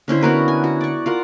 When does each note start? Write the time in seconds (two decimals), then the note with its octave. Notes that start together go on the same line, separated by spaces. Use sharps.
0.08 D3 C#4 E4 C5
0.21 B3 F#4 A#4 B4
0.48 G#5
0.64 F#4
0.81 D5 C#6
1.06 F4 A#4 F#5